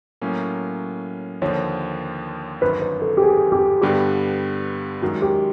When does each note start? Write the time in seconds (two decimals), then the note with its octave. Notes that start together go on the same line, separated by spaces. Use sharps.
0.21 A2 F#3 A#3 C#4
1.42 D#2 D3 F3 C#5
2.61 G1 F#2 D#3 B4
2.82 B4
3.02 A4
3.17 G4
3.22 G#4
3.52 G4
3.82 G2 D3 G3 B3 G4
5.02 F#2 D#3 G#3 F#4
5.22 G4